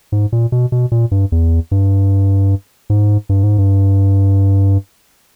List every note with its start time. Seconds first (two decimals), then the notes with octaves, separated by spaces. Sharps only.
0.12 G#2
0.32 A#2
0.52 B2
0.72 B2
0.92 A#2
1.11 G2
1.32 E2
1.71 G2
2.90 G#2
3.29 G2
3.43 G#2
3.58 G2